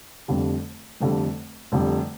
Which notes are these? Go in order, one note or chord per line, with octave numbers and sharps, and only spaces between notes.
F1 F2 D3 G3
F1 F2 D3 G3
F1 F2 D3 G3